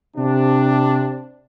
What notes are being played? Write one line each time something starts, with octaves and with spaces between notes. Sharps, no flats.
C3 D4